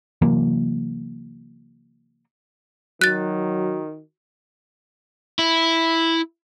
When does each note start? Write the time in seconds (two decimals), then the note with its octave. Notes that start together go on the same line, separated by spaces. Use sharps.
0.22 C3 E3 F#3 A#3
3.01 D#3 F#3 F#4 F#6 A6
5.39 E4